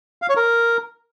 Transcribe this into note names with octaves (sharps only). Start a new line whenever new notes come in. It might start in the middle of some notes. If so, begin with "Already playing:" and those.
F5
C#5
A#4